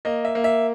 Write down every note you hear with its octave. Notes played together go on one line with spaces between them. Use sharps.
A#3 D#5
E5
A#3
E5